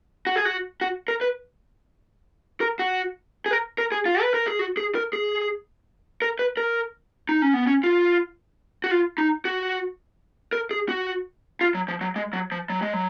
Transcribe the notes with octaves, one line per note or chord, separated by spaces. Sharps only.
F#4
G#4
F#4
F#4
A#4
B4
A#4
F#4
G#4
A#4
A#4
G#4
F4
B4
A#4
G#4
F#4
G#4
A#4
G#4
A#4
B4
A#4
D#4
C#4
B3
C#4
F4
F#4
F4
D#4
F#4
A#4
G#4
F#4
F4
F#3
F3
F#3
G#3
F#3
F3
F#3
G#3
F#3